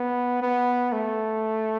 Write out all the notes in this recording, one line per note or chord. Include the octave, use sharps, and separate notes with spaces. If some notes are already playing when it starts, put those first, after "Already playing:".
Already playing: B3
B3
A3